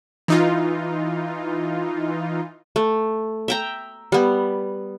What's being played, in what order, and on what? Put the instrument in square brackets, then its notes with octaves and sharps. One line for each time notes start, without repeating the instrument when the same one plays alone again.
[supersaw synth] E3 D#4 F4
[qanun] A3
E5 G5 A#5
G3 B3